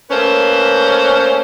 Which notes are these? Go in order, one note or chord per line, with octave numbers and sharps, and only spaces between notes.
A3 A#3 C#4 B4 C5